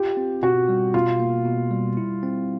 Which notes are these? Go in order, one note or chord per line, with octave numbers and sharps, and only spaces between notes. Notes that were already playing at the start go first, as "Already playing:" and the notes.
Already playing: F4 G4
C4
B2 F#4
G3
B2 F4
A#3
B2
G3
E4
C4